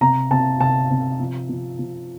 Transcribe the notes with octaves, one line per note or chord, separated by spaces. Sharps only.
C3 A#5
C3 A5
C3 A5
C3
F3
F3
F3